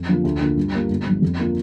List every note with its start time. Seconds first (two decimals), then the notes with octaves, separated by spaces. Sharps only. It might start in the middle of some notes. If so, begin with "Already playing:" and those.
Already playing: F2
0.09 D3 F3 A#3 F4
0.24 D2
0.41 D3 A#3 F4
0.57 G2
0.73 G3 A#3 F4
0.90 G1
1.06 G2 F3
1.22 F2
1.39 D3 A#3 D4 F4